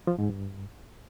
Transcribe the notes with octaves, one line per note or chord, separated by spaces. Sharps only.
F3
G#2
G2